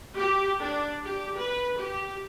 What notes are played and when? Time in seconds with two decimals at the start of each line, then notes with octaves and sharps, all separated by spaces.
0.17 G4
0.61 D4
1.04 G4
1.38 B4
1.77 G4